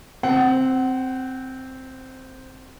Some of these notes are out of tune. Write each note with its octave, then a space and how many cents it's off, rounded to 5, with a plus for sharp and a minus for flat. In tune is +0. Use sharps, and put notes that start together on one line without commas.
C4 +0 F#5 +30